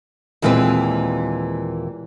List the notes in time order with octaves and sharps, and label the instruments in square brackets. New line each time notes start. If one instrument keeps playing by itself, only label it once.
[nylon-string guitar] D#2 A#2 E3 G#3 C4 B4